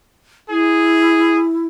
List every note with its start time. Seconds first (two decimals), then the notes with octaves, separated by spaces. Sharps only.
0.50 E4 G#4